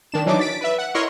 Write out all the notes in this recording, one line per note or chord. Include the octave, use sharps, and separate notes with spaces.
D#3 D4 E7
E3 F#3 D4 D#4 D6
A6 B6 D7
B4 E5
F#5
E4 A#4 C#5 D#5 C6 C#6